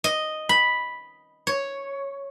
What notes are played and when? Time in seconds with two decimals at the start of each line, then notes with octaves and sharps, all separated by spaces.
0.04 D#5
0.49 B5
1.47 C#5